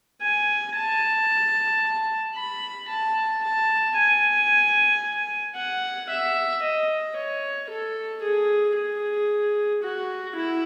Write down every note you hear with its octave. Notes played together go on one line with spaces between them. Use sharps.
G#5
A5
B5
A5
A5
G#5
F#5
E5
D#5
C#5
A4
G#4
G#4
F#4
E4